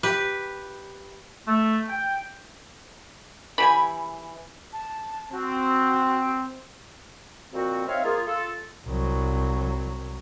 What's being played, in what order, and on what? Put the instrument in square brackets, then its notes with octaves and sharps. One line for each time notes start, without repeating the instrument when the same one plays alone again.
[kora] G4 [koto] B4
[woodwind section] A3
G5
[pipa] E3 G4 G#5 [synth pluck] B5
[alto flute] A5
[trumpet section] C4 [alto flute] F#4
[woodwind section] F2 A#2 C4 F#4
C4 D#4 C#5 E5 F5
A#3 F4 G#4
F4 A4
[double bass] C2 F#3